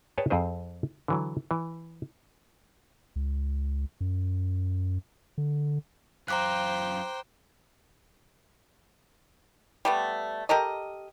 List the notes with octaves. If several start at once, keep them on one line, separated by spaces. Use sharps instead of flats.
G#4 B4 C#5 D5 G5 A5
F2 C4 G#4 C5
D3 E3 F#3
E3
C#2
F#2
D3
F#2 F4 C5 G5 A#5 D6 F#6
G3 A3 B3
G4 A4 A#4 D#5